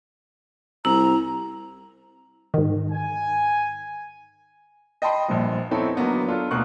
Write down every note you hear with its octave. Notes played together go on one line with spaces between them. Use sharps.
C2 E4 A#5
G#2 D#3
G#5
D#5 G5 A5 B5 C6 D#6
A#1 G2 F3
B3 C4 D#4 E4 A4 C#5
D3 F#3 A#3 B3 D#4
D4 F4 A4
D2 B2 A#3 A#4 C#6 F#6